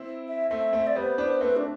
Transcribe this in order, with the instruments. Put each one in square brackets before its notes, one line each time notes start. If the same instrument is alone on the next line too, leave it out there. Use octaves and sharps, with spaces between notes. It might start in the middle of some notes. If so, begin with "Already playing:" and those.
Already playing: [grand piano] C4 E4
[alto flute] E5
[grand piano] A3 C4 [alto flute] E5
[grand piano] A3 C4
[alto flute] D5
[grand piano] G3 B3 [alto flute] C5
[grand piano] B3 D4
[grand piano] A3 C4 [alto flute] B4
[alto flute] D4